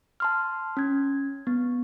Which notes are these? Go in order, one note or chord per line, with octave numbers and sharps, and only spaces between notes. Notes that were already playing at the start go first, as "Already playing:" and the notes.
A5 C6 F6
C#4 G#6
B3